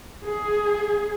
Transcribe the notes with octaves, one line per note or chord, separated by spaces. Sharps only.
G#4